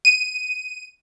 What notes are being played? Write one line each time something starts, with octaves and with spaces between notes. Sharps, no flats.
D#7